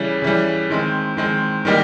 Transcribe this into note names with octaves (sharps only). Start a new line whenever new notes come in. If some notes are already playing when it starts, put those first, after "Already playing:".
Already playing: C#3 E3 G3
C#3 E3 G3
D#3 G#3 C4
D#3 G#3 C4
D#3 G3 A#3 D#4 G4